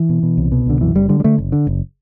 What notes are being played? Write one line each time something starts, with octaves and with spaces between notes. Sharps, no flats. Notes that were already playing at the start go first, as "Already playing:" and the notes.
Already playing: E3
B2
B2
C2
B2
C2 D3
F#2 E3
F#1 G3
D3 G3
G3
D3 A3
F#1
D3
F#1